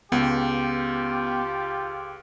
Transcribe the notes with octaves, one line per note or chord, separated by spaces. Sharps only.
C#2 B3 F4 G4